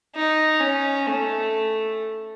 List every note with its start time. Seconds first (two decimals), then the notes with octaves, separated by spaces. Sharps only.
0.15 D#4
0.60 C#4
1.07 A3